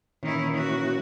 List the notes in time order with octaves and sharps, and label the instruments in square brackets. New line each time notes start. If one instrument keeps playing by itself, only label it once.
[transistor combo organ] A#2 E3 C#4 [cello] D#3 E4
[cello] F#4